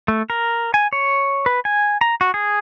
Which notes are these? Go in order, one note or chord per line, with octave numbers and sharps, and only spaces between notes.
A3
A#4
G#5
C#5
B4
G#5
A#5
F#4
G#4